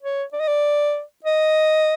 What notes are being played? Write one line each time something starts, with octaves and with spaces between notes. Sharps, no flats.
C#5
D5
D#5
D5
D#5